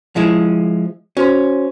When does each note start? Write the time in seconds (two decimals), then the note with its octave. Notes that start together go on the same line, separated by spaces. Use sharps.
0.16 F3 G#3 E4
1.17 C#4 F#4 C5 C6